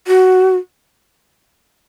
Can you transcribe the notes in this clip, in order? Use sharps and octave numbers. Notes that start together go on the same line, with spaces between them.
F#4